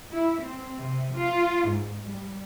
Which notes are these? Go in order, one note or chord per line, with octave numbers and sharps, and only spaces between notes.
E4
C4
C3
F4
G#2
G3